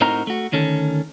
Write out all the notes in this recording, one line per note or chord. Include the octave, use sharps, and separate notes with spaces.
A2 C4 D#4 F#4 A#4 A#5
A3 F#4
D2 D#3 C#4 A4